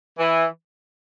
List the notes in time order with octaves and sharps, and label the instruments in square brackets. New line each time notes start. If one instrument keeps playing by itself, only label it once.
[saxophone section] E3